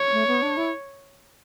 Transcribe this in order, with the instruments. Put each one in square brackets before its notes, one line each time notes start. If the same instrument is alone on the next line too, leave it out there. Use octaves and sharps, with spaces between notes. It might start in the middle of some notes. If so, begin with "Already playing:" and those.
Already playing: [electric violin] C#5
[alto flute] A3
B3
D4
E4